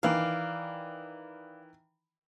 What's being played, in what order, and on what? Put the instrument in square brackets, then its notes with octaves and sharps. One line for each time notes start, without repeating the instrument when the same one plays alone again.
[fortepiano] D#3 E3 [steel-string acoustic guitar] D5 F5